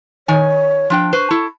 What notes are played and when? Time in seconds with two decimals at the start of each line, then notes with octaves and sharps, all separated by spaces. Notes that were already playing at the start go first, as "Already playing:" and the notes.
0.28 D#3 C#5 G#5
0.90 F3 D4 G5
1.13 B4 C5 C#6
1.31 E4 A4